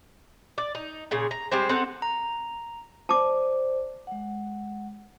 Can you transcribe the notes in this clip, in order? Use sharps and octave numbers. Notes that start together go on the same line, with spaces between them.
D5
D#4
A#2 C#3 G#4
A#5
G3 G#3 C4 C5
C4 D#4 A4 F#5
A#5
C5 D5 A5 D6
G#3 F#5